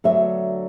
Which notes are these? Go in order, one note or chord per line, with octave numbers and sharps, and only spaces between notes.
D2 D3 F#3 B3 E5